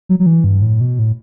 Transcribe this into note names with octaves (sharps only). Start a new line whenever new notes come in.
F#3
F#3
E3
G2
A2
B2
A2